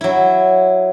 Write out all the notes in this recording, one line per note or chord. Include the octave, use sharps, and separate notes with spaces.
F#3 E4